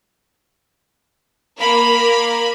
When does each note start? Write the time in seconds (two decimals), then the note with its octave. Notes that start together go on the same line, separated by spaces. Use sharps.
1.59 A#3 A#4 B5